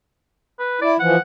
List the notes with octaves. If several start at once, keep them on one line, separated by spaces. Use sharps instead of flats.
B4
E4 D5
E3 F3 F#5